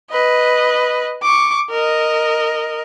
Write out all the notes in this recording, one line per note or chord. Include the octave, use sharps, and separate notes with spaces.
B4 D#5
C#6 D6
A#4 D#5